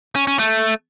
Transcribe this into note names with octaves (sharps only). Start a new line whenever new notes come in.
C#4
C#4
A3